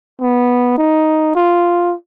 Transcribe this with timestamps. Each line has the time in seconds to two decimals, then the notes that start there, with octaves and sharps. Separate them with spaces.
0.21 B3
0.78 D#4
1.35 F4